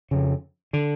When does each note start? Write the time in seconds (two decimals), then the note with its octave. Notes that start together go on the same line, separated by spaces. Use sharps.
0.11 F2 C#3
0.73 D3